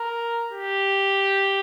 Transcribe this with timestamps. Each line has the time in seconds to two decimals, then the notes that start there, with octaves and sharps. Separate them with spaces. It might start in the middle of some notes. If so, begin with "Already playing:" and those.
Already playing: A#4
0.52 G4